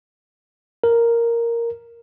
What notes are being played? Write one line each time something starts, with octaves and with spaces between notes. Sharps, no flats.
A#4